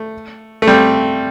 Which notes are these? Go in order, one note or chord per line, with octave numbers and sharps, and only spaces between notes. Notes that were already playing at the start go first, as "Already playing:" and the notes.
Already playing: A3
A3
G3 C4